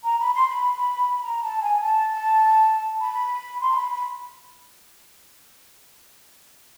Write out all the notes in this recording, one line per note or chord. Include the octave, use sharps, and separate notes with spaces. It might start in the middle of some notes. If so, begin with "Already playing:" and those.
A#5
B5
C6
B5
A#5
A5
G#5
A5
B5
C6
A#5
B5
B5